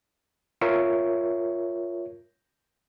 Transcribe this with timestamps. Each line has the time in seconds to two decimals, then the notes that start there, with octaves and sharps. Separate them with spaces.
0.61 F4 A#4 C#5 E5